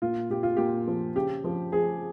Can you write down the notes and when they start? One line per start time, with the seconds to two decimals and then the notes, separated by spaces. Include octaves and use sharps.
0.02 A#2 F4
0.30 A#2 G4
0.43 F4
0.57 A#2 G4
0.87 F3
1.15 C#3 G4
1.44 F3
1.72 F3 G#4